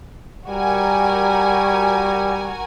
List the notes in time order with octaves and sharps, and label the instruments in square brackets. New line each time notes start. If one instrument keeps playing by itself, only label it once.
[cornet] G3 [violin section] F#4 A#4 G#5